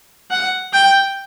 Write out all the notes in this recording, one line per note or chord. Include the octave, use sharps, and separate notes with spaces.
F#5
G5